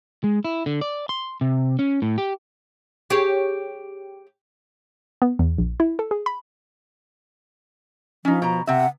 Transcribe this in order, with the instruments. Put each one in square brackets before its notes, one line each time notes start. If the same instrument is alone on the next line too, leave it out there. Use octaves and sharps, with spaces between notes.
[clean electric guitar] G#3
E4
D3
D5
C6
C3
C#4
A2
G4
[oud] G4 G#4 C#5
[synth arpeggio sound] B3
E2
A#1
E4
A4
G#4
B5
[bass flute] F3 [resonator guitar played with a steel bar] C#4 D#4
[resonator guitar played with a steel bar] B2 A#5
[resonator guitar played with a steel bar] C3 E5 [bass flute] F#5